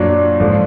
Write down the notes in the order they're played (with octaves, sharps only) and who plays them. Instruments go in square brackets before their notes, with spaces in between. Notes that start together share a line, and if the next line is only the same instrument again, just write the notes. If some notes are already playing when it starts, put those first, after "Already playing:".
Already playing: [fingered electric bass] F#2 [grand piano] A#2 F#3 D4
[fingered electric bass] G#2 [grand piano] D3 F3